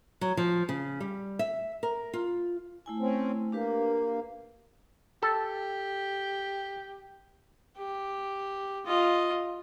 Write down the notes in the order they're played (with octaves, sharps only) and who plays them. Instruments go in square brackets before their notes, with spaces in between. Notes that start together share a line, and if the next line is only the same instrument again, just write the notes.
[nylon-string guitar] F#3
F3
C#3
G3
E5
A#4
F4
[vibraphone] A3 E4 G#5
[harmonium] C4 C#4
[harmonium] A#3 [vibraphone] D4 G4 B4
[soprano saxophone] G4 [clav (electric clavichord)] A4
[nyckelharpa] G4
F4 D#5